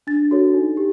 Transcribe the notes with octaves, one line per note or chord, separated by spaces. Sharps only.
D4 A6
F#4 A4 C#5
D#4
G4